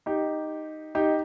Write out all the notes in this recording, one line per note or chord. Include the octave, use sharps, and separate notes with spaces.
D#4 G4
D#4 G4